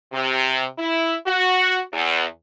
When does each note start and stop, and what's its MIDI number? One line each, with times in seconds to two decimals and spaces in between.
0.13 0.64 48
0.79 1.15 64
1.27 1.80 66
1.93 2.24 40